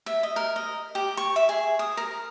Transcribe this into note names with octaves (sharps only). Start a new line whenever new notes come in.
E5
D#5
A#4
D#5
G4
C#6
E5
G#4
D#6
A#4